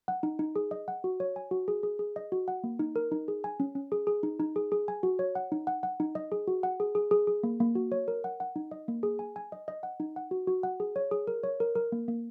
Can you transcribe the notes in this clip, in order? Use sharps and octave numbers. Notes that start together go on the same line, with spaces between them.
F#5
D#4
D#4
G#4
D#5
F#5
F#4
C#5
G#5
F#4
G#4
G#4
G#4
D#5
F#4
F#5
A#3
D#4
A#4
D#4
G#4
G#5
C#4
C#4
G#4
G#4
D#4
D#4
G#4
G#4
G#5
F#4
C#5
F#5
D#4
F#5
F#5
D#4
D#5
G#4
F#4
F#5
G#4
G#4
G#4
G#4
A#3
A#3
F#4
C#5
A#4
F#5
F#5
D#4
D#5
A#3
G#4
G#5
G#5
D#5
D#5
F#5
D#4
F#5
F#4
F#4
F#5
G#4
C#5
G#4
A#4
C#5
A#4
A#4
A#3
A#3